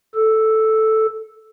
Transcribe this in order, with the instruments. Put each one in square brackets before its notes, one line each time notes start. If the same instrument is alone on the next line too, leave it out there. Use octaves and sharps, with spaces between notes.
[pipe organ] A4